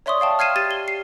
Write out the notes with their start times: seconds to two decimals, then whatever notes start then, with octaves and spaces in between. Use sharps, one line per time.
0.06 C#5 D5 E5 C6 C#6 D#6
0.20 D5 F5 G5 A5
0.39 F6 G#6 C7 D#7 E7
0.56 G4 A6 D#7
0.71 G7
0.88 C7